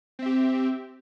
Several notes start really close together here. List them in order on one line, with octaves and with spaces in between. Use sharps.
C4 E5 G4